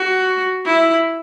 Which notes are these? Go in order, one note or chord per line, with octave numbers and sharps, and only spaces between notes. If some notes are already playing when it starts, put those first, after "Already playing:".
Already playing: F#4
E4